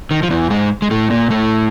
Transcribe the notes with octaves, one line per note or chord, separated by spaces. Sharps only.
D#3
F3
E2 E3
G#2 G#3
G#3
A2 A3
A#2 A#3
A2 A3